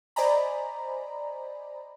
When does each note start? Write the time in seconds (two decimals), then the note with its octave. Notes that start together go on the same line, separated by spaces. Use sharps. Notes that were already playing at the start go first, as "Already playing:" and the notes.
0.16 C5 D5 D#5 G#5 A#5 B5